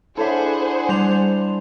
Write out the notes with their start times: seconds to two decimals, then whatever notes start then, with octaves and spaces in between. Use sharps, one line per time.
0.17 D4 E4 G#4 A4 C5 C#5 E5 F#5
0.89 G3 C6 F7